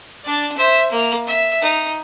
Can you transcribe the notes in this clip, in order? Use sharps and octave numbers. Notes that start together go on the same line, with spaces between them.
D4 D5
C5 E5
A#3
E5
D#4